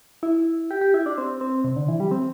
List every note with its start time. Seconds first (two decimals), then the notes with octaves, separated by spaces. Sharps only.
0.23 E4
0.71 G4
0.81 G4
0.94 E4
1.06 D4
1.18 C4
1.41 C4
1.64 C3
1.76 D3
1.88 E3
2.00 G3
2.11 C4